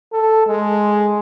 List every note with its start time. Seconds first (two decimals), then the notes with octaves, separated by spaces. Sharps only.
0.12 A4
0.46 G#3